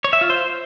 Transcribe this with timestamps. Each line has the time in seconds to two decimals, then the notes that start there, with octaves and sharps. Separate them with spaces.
0.04 C#5
0.13 E5
0.21 F4
0.30 C5